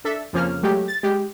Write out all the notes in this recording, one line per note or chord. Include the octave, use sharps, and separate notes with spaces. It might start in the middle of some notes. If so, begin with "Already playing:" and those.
D4 A4 E5
F2 C#3 F3 A#3 C#4 F6
F#3 G#3 A3 G4
A6
G#3 G4